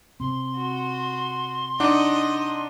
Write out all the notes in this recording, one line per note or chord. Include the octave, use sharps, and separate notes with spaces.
C3 C4 C6
F#4
D4 D#4 D#5 F#5 D6